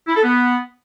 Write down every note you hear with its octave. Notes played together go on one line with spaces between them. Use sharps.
E4
A4
B3